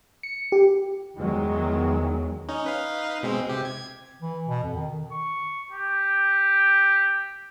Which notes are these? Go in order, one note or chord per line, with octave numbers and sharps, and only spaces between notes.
C#7
G4
E2 D#3 F#3 G#3
C#4 D#4
D#4 B4 F5
B2 G#3 C4
C3 G4
G#6
E3
B2
F2
D#3
C#6
G4